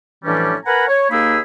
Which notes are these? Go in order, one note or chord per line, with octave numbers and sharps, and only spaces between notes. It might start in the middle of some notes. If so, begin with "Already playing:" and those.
A2 E3 F3 G3 C#4 D4
A#4 B4 F#5 G#5 A#5 B5
C#5
D#2 A#3 D#4 G#4 B5 E6